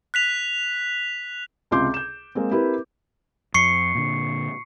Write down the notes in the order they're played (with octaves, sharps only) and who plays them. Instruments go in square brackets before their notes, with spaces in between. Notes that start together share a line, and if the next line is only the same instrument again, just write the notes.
[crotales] F#6 B6 F7
[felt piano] C#2 C3 F4 C6 D6 G6
G6 E7
G#3 A#3 C4
C4 E4 G4 A#4 B4
[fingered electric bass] F2 [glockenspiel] C#6 C7 C#7
[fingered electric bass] A#2 D3